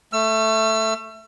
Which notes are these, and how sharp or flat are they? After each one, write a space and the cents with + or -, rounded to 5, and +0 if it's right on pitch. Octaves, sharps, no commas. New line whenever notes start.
A3 +0 E6 +40